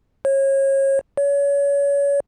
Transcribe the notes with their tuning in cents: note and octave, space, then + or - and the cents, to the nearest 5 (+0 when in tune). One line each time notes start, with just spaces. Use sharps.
C#5 -30
C#5 +30